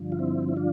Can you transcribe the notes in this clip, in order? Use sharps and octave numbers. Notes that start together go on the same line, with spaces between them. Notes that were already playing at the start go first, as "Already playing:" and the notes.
Already playing: G2 D3 F3
F4
C4 E4
E4
D4 F4